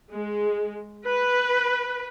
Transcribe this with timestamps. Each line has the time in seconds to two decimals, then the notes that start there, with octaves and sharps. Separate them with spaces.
0.10 G#3
1.06 B4